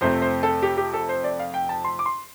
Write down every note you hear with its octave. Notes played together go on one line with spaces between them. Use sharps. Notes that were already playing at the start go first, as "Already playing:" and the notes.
F2 C3 A3 C4 C5
C5
A4
G4
G4
A4
C5
D5
F5
G5
A5
C6
D6
C6